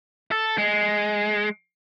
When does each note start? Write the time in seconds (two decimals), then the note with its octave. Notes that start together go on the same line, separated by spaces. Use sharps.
0.32 A4
0.58 G#3